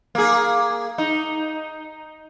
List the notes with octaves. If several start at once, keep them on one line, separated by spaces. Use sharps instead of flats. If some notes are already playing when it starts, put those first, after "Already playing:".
A#3 G#4
D#4